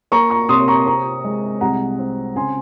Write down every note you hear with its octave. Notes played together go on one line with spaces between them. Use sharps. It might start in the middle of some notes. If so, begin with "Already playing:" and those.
A#3 A#5 C#6
A#5 C#6
C3 C6 D#6
A#5 C#6
C4 A#5 C#6
G#3
C2 F#5 A#5
C4
C#3 G#5 C6